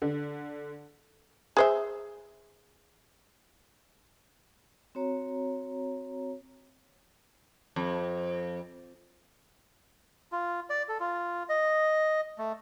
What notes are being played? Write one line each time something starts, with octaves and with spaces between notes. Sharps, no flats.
D3
G#4 C5 E5
C4 F#4 C#5 A#5
F2
F4
D5
A4
F4
D#5
A3